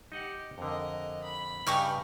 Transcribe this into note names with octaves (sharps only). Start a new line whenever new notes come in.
D#4 G4 D#5 F#5
F2 D3 A#4 D#5
B5
G2 C#3 D#4 G4 B4 C#6 F6